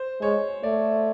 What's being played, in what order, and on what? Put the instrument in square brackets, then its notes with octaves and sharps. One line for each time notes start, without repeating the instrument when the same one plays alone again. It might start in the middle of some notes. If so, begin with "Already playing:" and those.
Already playing: [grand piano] C5
[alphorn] G#3 [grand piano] C#5
[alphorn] A3 [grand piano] D5